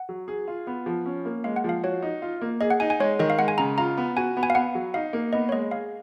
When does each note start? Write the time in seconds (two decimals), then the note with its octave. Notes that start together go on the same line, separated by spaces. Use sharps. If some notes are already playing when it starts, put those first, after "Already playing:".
Already playing: F#5
0.09 F#3
0.28 G#4
0.48 F4
0.67 B3
0.86 F3
1.06 C#4
1.25 A#3
1.44 G#3 F5
1.56 F#5
1.64 F3 F5
1.83 F#4 C#5
2.02 D#4
2.22 F4
2.41 A#3
2.61 G#4 D#5
2.70 F#5
2.80 D#4 G#5
2.90 G#5
3.00 G#3 C#5
3.19 D#3 D#5
3.30 F5
3.38 G#3 F#5
3.48 G#5
3.58 C#3 A#5
3.78 F4 A#5
3.97 B3
4.17 F#4 G#5
4.37 B3
4.43 G#5
4.50 F5
4.55 B3 F#5
4.75 F#3
4.94 D#4 F5
5.13 A#3
5.33 B3 D#5
5.49 C#5
5.52 G#3 D#5
5.71 G#4 F5